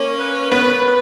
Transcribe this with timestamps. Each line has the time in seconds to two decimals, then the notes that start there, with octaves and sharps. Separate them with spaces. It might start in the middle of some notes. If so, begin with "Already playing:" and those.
Already playing: A#3 C#4
0.17 B4
0.52 B3 B4
0.86 B4